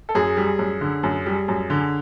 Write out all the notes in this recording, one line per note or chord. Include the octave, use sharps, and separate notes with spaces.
A4
F#2 G#4
G3
F#2
D3
F#2
G3
F#2
D3